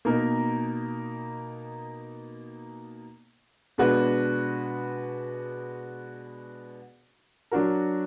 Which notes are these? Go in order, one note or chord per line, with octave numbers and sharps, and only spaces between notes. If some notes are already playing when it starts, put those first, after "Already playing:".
B2 A#3 D#4 A#4
B2 G#3 D4 F#4 B4
F#3 D4 F#4 A#4